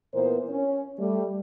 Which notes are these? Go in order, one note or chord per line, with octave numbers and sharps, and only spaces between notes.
A#2 E3 B3 A#4 C5
C#4
G3 A3